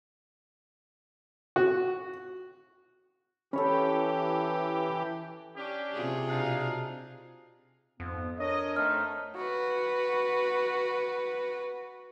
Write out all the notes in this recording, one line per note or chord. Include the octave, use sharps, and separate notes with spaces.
F#4
E3 C#4 G4 A4 B4 C#5
C#4 D4 G4
C3 F4 G#4
B2 D4 D#4 F5
F2 G#2 B3
D4 A#4 C#5 D#5
A3 C4 D#4 F6
F#4 B4